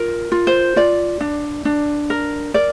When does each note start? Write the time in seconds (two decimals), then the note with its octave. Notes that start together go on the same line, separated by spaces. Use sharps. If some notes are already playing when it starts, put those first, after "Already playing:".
Already playing: F4 A#4
0.32 F4
0.47 C5
0.76 F4 D5
1.21 D4
1.65 D4
2.10 A#4
2.54 A#4 D5